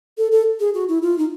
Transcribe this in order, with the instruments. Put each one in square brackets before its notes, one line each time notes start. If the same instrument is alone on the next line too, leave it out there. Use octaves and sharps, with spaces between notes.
[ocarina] A4
A4
G#4
F#4
E4
F4
D#4